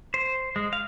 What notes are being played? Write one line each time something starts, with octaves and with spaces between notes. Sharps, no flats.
C5
G#3
F5